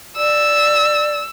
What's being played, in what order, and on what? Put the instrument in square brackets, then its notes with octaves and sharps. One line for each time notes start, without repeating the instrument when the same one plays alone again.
[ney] D5 [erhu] E6